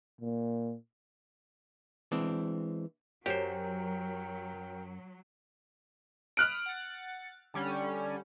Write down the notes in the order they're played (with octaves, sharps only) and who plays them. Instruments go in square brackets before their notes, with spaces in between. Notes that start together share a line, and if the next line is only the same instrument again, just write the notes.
[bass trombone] A#2
[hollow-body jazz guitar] E3 G#3 C4 D4
[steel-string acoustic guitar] F#2 [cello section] F#3 [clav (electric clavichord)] G4 C5 [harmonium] A#4 G5
[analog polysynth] B5 D#6 [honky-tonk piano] F6 F#6 D7
[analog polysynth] F#5 A6
D3 G3 C#4